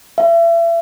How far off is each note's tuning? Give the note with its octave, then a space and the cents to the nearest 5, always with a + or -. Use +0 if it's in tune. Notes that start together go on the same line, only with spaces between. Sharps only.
E5 +35